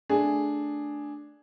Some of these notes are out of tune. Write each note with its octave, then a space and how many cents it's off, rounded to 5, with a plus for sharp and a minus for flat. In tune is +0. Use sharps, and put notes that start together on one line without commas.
A3 +0 D4 +0 G#4 +0